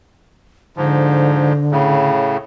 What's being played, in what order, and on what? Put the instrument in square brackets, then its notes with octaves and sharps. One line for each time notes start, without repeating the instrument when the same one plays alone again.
[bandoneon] G#2 F3 [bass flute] D3
[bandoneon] A2 C#3